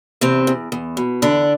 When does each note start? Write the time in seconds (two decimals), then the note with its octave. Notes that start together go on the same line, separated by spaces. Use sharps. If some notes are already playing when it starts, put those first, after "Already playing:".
0.21 E2 C3 C4
0.47 E2
0.72 E2
0.97 B2
1.22 E2 D3 D4